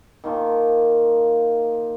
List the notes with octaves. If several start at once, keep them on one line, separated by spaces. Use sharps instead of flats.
D#3 A#3 F4 A5